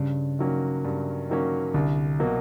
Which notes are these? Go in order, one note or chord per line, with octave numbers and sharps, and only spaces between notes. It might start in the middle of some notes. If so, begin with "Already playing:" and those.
Already playing: G2 C#3
D#3 F#3 A#3 C#4
G2
D#3 F#3 A#3 C#4
C2 D3
B2 F#3 A#3